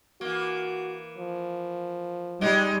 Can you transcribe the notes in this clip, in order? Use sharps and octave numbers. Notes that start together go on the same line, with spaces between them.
E3 A#3 F#4
F3
G3 G#3 D#4 G4